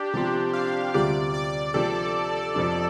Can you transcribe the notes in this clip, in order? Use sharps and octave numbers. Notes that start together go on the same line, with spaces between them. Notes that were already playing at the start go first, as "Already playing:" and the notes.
Already playing: D4 G4
C3 F3 C4 G4
F5
D2 C3 G3 F4 D5
D5
C3 F3 D4 G4 A4
F2 C3 F3 D4